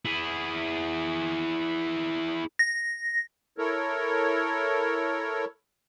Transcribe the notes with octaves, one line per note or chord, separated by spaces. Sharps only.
E4 G#4
A#6
E4 A4 A#4 C#5